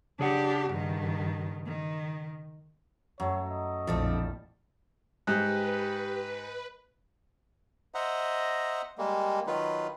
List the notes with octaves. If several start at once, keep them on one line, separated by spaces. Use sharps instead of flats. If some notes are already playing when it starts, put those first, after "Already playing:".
C#3 D4 G4 G#4 F#5
G2 D#3
D#3
F#2 F#3 A3 C#5
D#5
A#1 F2 A2 F3 G3 A3 C4 A5
G#2 G4 B4 G5 F#6
C5 D#5 E5 F#5 A#5
G3 G#3 A#3
D#3 F#3 D#4 F4 B4